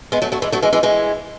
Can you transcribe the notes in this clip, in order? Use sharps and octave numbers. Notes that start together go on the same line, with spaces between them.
G#3 B3
F#3 A3
F#3 A3
E3 G#3
F#3 A3
E3 G#3
E3 G#3
E3 G#3